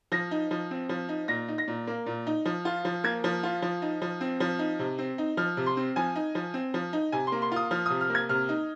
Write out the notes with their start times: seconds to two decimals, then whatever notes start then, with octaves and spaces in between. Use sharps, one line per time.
0.12 F3 A#6
0.31 D#4
0.51 F3
0.71 C4
0.89 F3
1.09 D#4
1.28 A#2 A#6
1.48 D#4
1.58 A#6
1.68 A#2
1.87 A#3
2.06 A#2
2.27 D#4
2.45 F3
2.65 F4
2.85 F3
3.04 A#3 G#6
3.24 F3
3.43 F4
3.62 F3
3.82 D#4
4.02 F3
4.21 C4
4.40 F3
4.59 D#4
4.79 C3
4.98 C4
5.18 D#4
5.37 F3 F6
5.57 C3
5.66 C6
5.77 C4
5.96 F3 G#5
6.16 D#4
6.35 F3
6.54 C4
6.74 F3
6.93 D#4
7.12 C3 G#5
7.27 A#3 C6
7.42 C6
7.52 F4 D#6
7.71 F3 F6
7.86 C3 D#6
8.01 F6
8.10 A#3
8.15 G#6
8.29 C3 F6
8.49 D#4